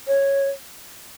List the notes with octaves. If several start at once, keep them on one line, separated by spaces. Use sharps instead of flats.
C#5